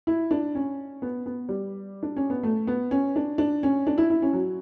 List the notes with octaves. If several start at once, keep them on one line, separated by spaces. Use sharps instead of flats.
E4
D4
C#4
B3
B3
G3
D4
C#4
B3
A3
B3
C#4
D4
D4
C#4
D4
E4
E4
C#4
F#3